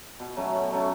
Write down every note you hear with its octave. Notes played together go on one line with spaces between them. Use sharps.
B2
F#3 A3 C#4
B2
F#3 A3 C#4